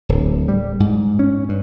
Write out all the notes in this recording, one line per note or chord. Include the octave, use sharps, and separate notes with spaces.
D1
G3
G#2
C#4
G2